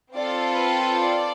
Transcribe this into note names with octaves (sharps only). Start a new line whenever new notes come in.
C4 F4 A4 D5
B4
D5